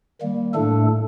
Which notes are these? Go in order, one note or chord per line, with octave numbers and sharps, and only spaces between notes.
D#3 G3 A#3
A2 A3 D4 A4